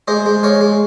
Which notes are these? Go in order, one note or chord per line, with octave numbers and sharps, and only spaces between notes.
G#3 C5 D#5
G#3
G#3 C#5 F5
G#3